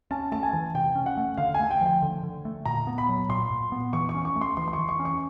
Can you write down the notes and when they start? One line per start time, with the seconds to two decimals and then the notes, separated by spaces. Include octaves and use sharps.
0.11 C#4 A5
0.32 A3 A5
0.43 G#5
0.53 E3
0.74 C3 G5
0.96 C#4
1.06 F#5
1.17 A3
1.38 D3 F5
1.54 G#5
1.60 A3
1.71 G5
1.81 F3 G5
2.02 D3
2.23 D3
2.45 A3
2.66 A#2 A#5
2.87 B3
2.98 B5
3.09 F#3
3.29 A#2 C6
3.51 A#2
3.72 B3
3.93 E3 C#6
4.09 C#6
4.15 C#4
4.25 C#6
4.36 A3
4.41 C6
4.57 E3 C6
4.68 C6
4.73 C#6
4.78 E3
4.89 C#6
4.99 C#4
5.05 C#6